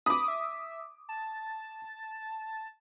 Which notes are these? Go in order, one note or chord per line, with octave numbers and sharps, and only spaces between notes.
B5 D6 D#6
E5
A5